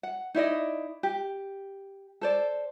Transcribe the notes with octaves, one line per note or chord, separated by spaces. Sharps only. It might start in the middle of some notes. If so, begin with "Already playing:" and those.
F#5
D#4 E4 D5 D#5
G4
A4 C5 D5